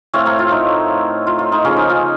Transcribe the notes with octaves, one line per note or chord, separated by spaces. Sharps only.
A2 A3 C4 C#5 F5
A#4 C#5
F4
D#4
F4
F4
D#4
C#3 F3 A#3 C#4 F4
D#4
F4